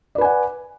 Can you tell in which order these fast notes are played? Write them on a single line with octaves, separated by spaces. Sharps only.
D5 B4 G#5 F#5